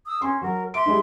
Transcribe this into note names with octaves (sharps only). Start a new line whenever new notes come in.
D#6 E6
C#4 C6
F#3 A#4
E5 C6 D6 D7
G3 G#3 D#4